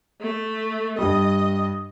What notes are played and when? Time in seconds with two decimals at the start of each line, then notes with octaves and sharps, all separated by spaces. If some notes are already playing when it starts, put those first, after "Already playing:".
0.21 A3
0.99 G2 G3 D#5